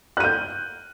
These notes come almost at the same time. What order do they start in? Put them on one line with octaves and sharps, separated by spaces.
F#6 D#7 G6